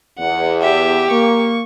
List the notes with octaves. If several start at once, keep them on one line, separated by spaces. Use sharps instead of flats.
E2 F#5
G4 E5
A#3 C#6